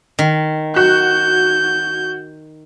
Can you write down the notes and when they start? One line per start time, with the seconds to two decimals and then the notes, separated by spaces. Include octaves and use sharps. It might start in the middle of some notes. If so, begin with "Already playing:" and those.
0.19 D#3
0.76 F#4 G6